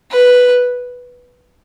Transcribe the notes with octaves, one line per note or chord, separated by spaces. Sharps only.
B4